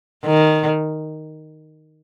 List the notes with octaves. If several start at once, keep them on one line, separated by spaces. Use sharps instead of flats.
D#3